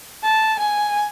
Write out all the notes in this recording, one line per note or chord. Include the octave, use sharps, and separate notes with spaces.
A5
G#5